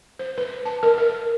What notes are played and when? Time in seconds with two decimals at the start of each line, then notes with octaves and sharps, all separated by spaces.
0.19 C5
0.38 B4
0.65 A5
0.83 A#4
0.98 A#4